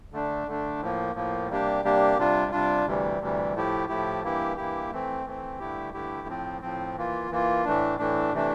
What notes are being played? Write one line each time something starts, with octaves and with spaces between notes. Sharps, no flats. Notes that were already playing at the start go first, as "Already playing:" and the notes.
D3 A3 D4
D3 A3 D4
A2 F3 A#3
A2 F3 A#3
C3 G3 A#3 D4 G4
C3 G3 A#3 D4 G4
C3 G3 D4 F4
C3 G3 D4 F4
D2 C3 E3 G3
D2 C3 E3 G3
A2 F3 A3 E4 G4
A2 F3 A3 E4 G4
G2 E3 A#3 E4 G4
G2 E3 A#3 E4 G4
E3 A3 C4
E3 A3 C4
G2 D3 A3 E4 G4
G2 D3 A3 E4 G4
A2 F3 C4
A2 F3 C4
E3 A#3 F4
E3 A#3 F4
A2 E3 A3 D4
A2 E3 A3 D4
C3 E3 A3 D4